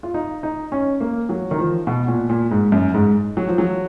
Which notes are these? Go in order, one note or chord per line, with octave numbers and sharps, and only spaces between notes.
F4
D#4
D#4
C#4
A#3
F#3
D#3
F3
B2
A#2
A#2
G#2
F#2
G#2
F#3
F3
F#3